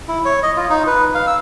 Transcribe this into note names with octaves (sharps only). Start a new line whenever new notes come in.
E4
C#5
D#5
F4
D#4
B4
F5
E6